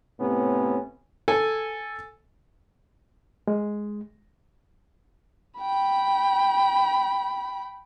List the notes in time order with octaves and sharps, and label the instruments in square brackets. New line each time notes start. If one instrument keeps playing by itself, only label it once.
[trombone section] A2 C3 B3 C#4
[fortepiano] A4 G#5
[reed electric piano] G#3
[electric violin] G5 B5